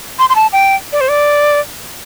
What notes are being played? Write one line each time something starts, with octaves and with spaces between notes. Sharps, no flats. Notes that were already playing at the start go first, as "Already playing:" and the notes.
C6
C6
A5
G5
D5
C5
D5